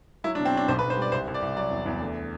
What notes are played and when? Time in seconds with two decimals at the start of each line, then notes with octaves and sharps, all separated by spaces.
0.24 F#3 E4
0.35 D4
0.39 B2
0.45 C4
0.53 F#3 D4
0.68 B1 C5
0.79 B4
0.82 B1
0.90 C5
0.97 G3 D5
1.12 C2 C5
1.27 C2
1.34 D5
1.42 C2
1.56 F#3 D5
1.71 E2
1.86 E2
2.00 D2